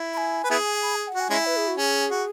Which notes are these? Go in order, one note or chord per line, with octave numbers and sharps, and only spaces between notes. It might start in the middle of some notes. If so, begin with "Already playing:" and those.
Already playing: E4
B5
G#5
B4
B3 E4 G#4
B5
G#5
F#5
F#4
G#5
G#3 C#4 E4
B4
G#4
F#4
C#4 G#4
F#4